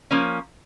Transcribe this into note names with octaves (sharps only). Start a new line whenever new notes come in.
F3 A#3 C#4